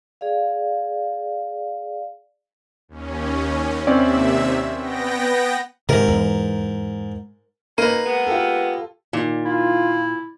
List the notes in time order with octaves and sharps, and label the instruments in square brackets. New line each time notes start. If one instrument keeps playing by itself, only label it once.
[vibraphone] G#4 D5 F5
[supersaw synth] D#2 C#4
[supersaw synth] D#2 C3 E5 [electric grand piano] C4 C#4 D5
[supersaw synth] B3 G5 A#6
[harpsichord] G#2 A#4 [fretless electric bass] C3 D#3
[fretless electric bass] E2
[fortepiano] A#3 [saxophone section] C#4 D#4 [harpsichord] A#4 B4 [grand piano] D#7
[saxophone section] G#3 B3
[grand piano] F4 G4 A4
[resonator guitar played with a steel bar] A#2 [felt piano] D#3
[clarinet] E4 [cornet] F4